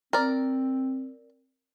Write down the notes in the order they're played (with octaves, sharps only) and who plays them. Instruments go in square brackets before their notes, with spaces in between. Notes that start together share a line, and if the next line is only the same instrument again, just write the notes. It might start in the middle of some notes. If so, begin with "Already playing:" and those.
[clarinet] C4 [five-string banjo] A#4 D5